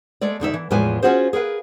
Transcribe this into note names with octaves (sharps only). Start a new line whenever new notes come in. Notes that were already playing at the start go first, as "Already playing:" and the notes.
G#3 A3 D5
E2 D3 D#4 E5
E3
E2 A2 F3 G#3 B4 G#5
C#4 F4 F#4 G#4 C5
G#4 A#4 B4 F5